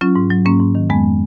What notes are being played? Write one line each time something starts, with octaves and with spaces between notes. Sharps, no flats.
F#3 C#4 F4
G#2
F#3
G#2 A#3 C#4
G#2
D#3
F2 G#3 B3